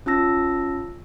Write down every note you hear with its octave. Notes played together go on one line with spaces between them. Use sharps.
C#4 F4 A5 E6 A#6